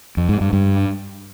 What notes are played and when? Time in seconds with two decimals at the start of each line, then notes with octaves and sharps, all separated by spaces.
0.17 F2
0.29 G#2
0.41 G2
0.53 G2